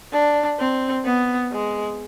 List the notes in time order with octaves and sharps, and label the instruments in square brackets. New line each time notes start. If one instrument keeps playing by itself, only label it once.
[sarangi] D4
C4
B3
G#3